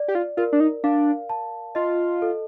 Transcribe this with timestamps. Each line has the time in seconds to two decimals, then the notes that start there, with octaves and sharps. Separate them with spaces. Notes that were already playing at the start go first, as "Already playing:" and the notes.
Already playing: D5
0.08 G4
0.15 F4
0.37 F4 A#4
0.53 D4
0.60 D#4
0.84 D4 F5
1.29 A5
1.75 F4 D#5
2.22 A4